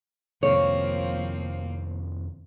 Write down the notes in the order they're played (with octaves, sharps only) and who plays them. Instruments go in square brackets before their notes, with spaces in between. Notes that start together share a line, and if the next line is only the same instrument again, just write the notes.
[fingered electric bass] F2 C3 D#3 [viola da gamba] F3 A#3 C4 [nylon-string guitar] C#5